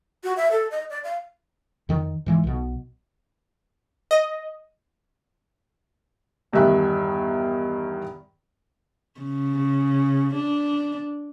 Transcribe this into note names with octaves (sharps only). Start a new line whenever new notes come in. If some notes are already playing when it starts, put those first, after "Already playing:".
F#4
E5
A4
D#5
D5
F5
F2 D#3
G#2 E3 G#3
B1 B2
D#5
E2 G2 D#3 E5 F#6
C#3
D4